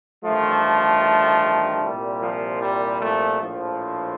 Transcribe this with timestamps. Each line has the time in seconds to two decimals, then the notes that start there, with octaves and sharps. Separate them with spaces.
0.24 A1 G2 D#3 F3 A3
1.82 C2 A#2 G3
2.22 F3
2.62 G3
3.00 F3 A3
3.40 A#1 A2 F3